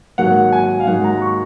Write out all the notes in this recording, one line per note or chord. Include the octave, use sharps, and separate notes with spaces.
G#2 D#3 F#3 A#3 F#5
G#5
F5
G#2 D#3 F#3 A#3 F#5
A#5
C#6